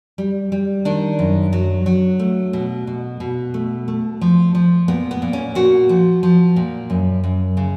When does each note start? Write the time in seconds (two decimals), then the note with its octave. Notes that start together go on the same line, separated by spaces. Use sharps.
0.18 G3
0.52 G3
0.85 D#3 D4
1.19 F#2
1.53 F#3
1.86 F#3
2.19 A3
2.53 B2
2.87 B2
3.20 B2
3.54 A3
3.88 A3
4.21 F3
4.55 F3
4.88 A#2 B3
5.11 B3
5.22 A#2
5.33 C#4
5.55 A#2 F#4
5.89 F3
6.23 F3
6.56 A#2
6.90 F#2
7.24 F#2
7.57 C#3